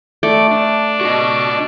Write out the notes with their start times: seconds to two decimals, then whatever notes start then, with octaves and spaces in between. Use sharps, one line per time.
0.23 A3 D5
0.51 D4
1.01 F#4 D#5